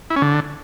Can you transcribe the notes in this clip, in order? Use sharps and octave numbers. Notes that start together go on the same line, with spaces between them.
E4
C#4
D3